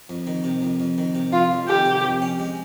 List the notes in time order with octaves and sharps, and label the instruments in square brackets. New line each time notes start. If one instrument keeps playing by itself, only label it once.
[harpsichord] F2
D#3
C3
F2
F2
D#3
C3
[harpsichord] F2 [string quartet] F4
[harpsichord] F2
[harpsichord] D#3 [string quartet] G4
[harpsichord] C3
F2
C#4
G#3